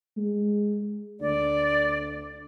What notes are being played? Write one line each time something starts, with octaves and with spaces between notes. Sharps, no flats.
G#3
D2 D5